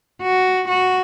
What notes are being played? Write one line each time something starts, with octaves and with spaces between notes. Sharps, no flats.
F#4
F#4